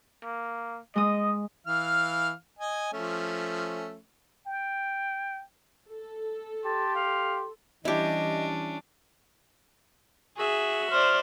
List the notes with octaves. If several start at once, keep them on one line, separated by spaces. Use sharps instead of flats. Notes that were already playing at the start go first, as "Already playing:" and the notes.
A#3
G#3 D#5 D#6
E3 F5 F6
D#5 G#5
F3 A3 C#4
G5
A4
G4 A5 C6
F5
E3 G3 C#4 D4 E4 G4 D#5
F#4 G#4 E5
C5 D5 F6